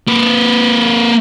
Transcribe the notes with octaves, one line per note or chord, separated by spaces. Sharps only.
A#3 B4